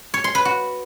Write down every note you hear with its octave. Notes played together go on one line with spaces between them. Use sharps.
C#5
C6
B4
F#4